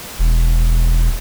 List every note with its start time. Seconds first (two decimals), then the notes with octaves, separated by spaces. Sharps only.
0.19 E1